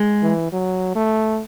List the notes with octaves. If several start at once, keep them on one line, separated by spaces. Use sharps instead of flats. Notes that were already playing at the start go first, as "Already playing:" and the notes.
Already playing: G#3
E3
F#3
A3